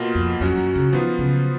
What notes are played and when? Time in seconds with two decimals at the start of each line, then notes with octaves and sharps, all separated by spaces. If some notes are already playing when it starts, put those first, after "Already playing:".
Already playing: B2 A#3 F4
0.15 F2
0.40 F2 F#3 C#4 F#4
0.57 F#2
0.75 C#3
0.93 D#3 F3 B3 F4
1.19 C#3